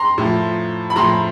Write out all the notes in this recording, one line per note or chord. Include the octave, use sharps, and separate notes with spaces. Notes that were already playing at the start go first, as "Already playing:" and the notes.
Already playing: A#5 C6
A2 F3
B5
A2 F3 A#5 C6